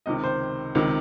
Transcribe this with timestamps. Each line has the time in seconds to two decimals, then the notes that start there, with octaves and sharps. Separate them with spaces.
0.06 C#2 C3 D#3 D#5
0.24 C5
0.75 C#2 C3 D#3 A#4